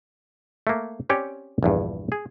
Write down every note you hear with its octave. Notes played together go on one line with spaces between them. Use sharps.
A3 A#3
C4 C#4 G4 C#5 D5
A#1 E2 G2
G#4